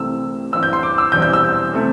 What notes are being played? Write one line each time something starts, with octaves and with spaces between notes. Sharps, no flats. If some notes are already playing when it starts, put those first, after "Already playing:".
Already playing: C2 C3 E3 A3 C4 E6
G2 E3 C4 E6
G6
C6
D6
E6
E1 E2 E3 G3 C4 G6
G6
E6
C3 A3 C4